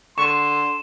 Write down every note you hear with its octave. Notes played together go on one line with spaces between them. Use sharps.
D3 C6 C#6 D#7 E7